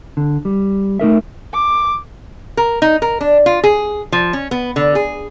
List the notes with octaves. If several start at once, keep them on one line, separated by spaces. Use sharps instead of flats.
D3
G3
A3 D#4 A#4 E5
D6
A#4
D#4
A#4
D4
F4
G#4
F3
C#4
B3
D3
G#4